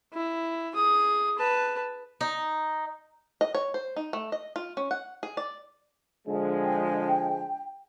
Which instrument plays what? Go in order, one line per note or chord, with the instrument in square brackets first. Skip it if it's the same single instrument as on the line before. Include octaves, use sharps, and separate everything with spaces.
[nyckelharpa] E4
G#4 D#6
B4 A5
[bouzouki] D#4
[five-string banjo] D#5
C#5
C5
D#4
A3
D#5
F4
C#4
F#5
G#4
D5
[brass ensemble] D3 F3 G#3
[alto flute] G5